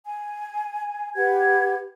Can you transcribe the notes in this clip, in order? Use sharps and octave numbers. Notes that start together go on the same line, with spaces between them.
G#5
G4 B4 F#5 G#6